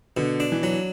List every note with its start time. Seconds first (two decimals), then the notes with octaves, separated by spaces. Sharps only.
0.17 B2 D3
0.40 D4
0.52 E3
0.63 F#3